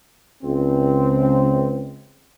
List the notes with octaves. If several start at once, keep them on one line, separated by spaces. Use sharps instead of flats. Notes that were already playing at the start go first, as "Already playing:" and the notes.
C#2 C4